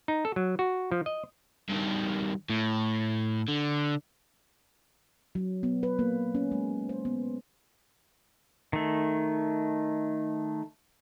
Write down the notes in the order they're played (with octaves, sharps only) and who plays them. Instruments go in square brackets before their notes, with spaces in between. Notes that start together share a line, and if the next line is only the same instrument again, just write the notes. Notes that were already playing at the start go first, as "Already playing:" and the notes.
[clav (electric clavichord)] D#4
A4
F#3
F#4
F3
D#5
[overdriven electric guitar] G2 D#3
A2
D3
[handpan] F#3
B3
B4
A#3
C#4
G#3
C5
B3
[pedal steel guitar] D#3 A3